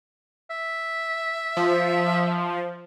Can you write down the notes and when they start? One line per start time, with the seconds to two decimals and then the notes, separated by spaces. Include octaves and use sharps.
0.50 E5
1.57 F3